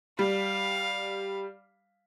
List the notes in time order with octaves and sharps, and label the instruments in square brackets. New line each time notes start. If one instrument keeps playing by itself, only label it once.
[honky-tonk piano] G3 [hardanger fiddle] F5